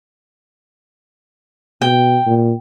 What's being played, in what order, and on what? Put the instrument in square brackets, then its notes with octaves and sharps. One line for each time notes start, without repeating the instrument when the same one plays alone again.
[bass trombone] B2 [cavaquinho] G5
[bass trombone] A#2